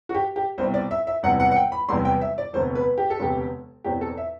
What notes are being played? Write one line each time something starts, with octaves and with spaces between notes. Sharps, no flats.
F#4
G4
G4
C2 B2 G3 C4 C5
D5
E5
E5
E1 E2 C3 G3 B3 F#5
F#5
F#5
G5
B5
E1 E2 C3 G3 B3 C6
G5
E5
D5
E1 D2 C3 F#3 B3 C5
B4
G4
A4
E1 D2 C3 F#3 B3 G4
E2 B2 F#3 C4 G4
A4
E5